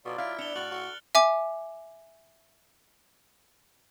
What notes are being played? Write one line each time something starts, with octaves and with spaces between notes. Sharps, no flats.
B2 F#3 F4 D5
E4 F5 F6 D7
B3 D4 C#7 F7 G7
A2 F#4 F#6 A6 F#7
F#4 A4
E5 G#5 D6